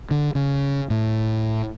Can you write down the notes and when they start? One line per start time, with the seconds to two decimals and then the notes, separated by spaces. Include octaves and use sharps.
0.11 D3
0.35 C#3
0.90 A2